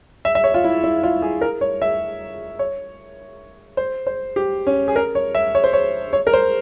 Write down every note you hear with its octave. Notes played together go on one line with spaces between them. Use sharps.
E5
E5
C#5
F4
E4
E4
F4
G#4
A#4
C#5
E5
C#5
C5
C5
G4
C#4
G#4
A#4
C#5
E5
C#5
C5
C#5
C#5
A#4
C5